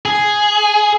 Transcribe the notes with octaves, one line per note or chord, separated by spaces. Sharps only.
G#4